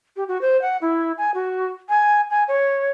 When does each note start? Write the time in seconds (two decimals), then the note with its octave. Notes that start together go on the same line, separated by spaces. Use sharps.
0.16 G4
0.28 F#4
0.41 C5
0.62 F#5
0.81 E4
1.18 G#5
1.34 F#4
1.89 G#5
2.30 G#5
2.48 C#5